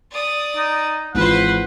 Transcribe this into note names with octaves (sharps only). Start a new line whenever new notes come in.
D5 D#6
D#4
G#1 E3 F4 B4 C5 F#5